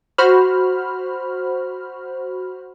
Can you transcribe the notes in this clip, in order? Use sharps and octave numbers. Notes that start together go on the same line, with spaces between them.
F#4 C5 B5 F6